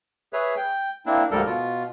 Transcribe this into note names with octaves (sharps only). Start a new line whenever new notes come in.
G#4 B4 C#5 E5
G5
A#3 C4 D4 E4
D2 G#2 F3 G3 A4 A#4
B2 F4